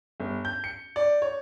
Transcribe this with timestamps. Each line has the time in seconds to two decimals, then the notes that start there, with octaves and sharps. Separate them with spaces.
0.20 G1
0.45 G6
0.64 C#7
0.96 D5
1.22 C#5